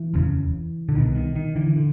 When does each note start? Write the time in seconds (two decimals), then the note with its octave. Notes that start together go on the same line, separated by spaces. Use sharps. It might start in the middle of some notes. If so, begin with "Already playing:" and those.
Already playing: E3
0.14 F1 D#2 C#3
0.89 D3
0.95 C2 B2 D#3
1.15 D#3
1.35 D#3
1.56 D3 E3
1.76 D3